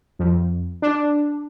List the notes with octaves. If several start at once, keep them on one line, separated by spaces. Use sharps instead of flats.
F2
D4